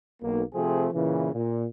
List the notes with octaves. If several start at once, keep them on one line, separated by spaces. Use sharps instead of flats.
B1 A#3
C3 F3 A3 C4 G#4
A#2 C#3 E3
A#2